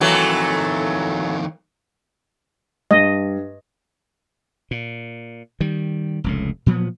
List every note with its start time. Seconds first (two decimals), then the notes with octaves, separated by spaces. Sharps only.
0.01 F2 D#3 E3 F#3 A3
2.91 G2 D#5
4.71 A#2
5.61 D#3 G3
6.24 F1 C#2 A2
6.66 A#2 F3 F#3 B3